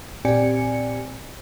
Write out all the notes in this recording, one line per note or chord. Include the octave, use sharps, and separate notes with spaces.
A#2 C4 G4 D5 G#5 C#7